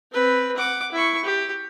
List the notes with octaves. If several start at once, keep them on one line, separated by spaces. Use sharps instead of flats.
C4 B4
F#5 D6
E4 C#6
G4